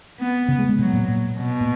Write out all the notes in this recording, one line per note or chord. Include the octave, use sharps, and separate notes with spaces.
B3
C#3
G#3
G#3
B2 F#3
A#2
A#2
B2
A#2